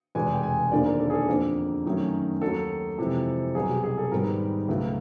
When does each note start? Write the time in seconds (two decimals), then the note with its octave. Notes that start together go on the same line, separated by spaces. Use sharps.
0.15 F1 E2 B2 G#3 G#5
0.33 G5
0.43 G#5
0.72 E1 D#2 D3 F3 A#3 D5
0.86 A#4
1.00 A4
1.10 G#4
1.14 A4
1.28 F2 D3 F3 A#3 A#4
1.85 F#2 D#3 F#3 A3 C#4
2.41 D#2 D#3 F#3 A4
2.98 F2 C3 E3 G#3
3.55 C2 B2 F#3 G#4
3.69 G4
3.84 G#4
3.98 A4
4.11 G#2 D#3 G3 B3 A#4
4.68 C#2 B2 F#3 A3